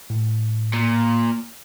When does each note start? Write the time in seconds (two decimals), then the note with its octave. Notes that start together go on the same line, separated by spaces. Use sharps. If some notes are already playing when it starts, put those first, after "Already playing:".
0.10 A2
0.74 A#2